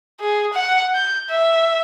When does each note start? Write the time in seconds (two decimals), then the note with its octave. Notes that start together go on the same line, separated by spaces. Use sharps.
0.21 G#4
0.53 F#5
0.95 G6
1.30 E5